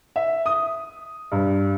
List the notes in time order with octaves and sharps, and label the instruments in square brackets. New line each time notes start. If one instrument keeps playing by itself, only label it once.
[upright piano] E5
D#6
G2